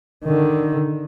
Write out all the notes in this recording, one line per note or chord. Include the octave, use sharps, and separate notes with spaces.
D3 D#3